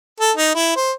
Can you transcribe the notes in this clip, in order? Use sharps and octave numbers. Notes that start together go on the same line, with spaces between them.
A4
D#4
E4
C5